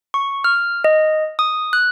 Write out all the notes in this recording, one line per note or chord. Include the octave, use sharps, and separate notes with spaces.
C#6
F6
D#5
D#6
F#6